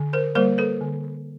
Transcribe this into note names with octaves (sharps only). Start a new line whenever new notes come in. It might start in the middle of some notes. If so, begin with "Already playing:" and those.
Already playing: D3
A#4 C5
G3 A#3 A#4 C5
A4 B4
D3